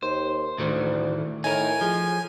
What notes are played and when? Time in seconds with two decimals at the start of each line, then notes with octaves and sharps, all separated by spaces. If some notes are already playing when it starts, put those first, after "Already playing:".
0.03 D#2 C5
0.58 D2 A2 D#3 E3
1.44 A2 D#4 A#4 G#5
1.81 F3 G#4